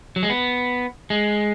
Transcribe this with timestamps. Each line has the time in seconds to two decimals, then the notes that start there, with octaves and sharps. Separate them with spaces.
0.16 F#3
0.23 G#3
0.30 B3
1.10 G#3